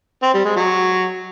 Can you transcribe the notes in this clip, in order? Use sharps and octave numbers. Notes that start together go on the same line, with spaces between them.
C4
G3
G#3
F#3